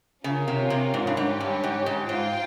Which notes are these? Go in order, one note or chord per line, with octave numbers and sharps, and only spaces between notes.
C#3 C#4 F4 A#4 C#5
C3
C3
G#2
G2
G#2 C#4 G4 C#5
G2
G#2
G#2
G#2 F4 C5 G5